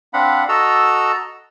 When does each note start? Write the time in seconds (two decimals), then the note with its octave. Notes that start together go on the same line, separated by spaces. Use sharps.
0.14 C4 D4 F5 F#5 B5
0.49 F#4 A4 D#5 A#5 E6